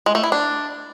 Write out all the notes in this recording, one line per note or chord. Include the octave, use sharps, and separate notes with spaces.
G#3
A3
E4
D4